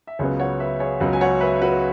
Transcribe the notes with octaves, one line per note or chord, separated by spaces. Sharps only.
E5
C#2 C#3 F#3 B3 G#4 C#5
C#5 F#5
B4 E5
G#4 C#5
C#2 C#3 F#3 B3 F#4 B4
G#5
C#5 F#5
B4 E5
F#4 B4